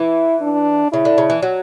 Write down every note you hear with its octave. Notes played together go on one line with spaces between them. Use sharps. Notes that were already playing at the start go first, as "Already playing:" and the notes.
Already playing: E3 E4
D4
C#3 E4
D3
C#3
E3
F#3